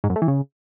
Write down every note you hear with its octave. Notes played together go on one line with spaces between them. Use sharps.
G#2
F#2
A3
E3
C#3